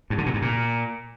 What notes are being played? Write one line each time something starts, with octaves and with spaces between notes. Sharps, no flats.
G2
D3
A#2
G2
A#2